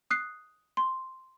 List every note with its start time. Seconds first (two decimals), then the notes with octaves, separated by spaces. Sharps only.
0.10 D#6 F#6 C7
0.77 C6